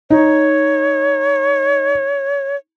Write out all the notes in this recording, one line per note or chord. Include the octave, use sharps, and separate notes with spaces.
D#4 C#5